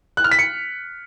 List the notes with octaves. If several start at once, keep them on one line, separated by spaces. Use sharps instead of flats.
F#6
F6
B6
C#7